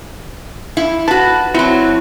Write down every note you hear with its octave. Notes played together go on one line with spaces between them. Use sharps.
E4
F#4 B4 A5
F#3 C4 E4